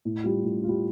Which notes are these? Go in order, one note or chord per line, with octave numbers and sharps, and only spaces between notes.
A2
G3 F4
A2
F4
G3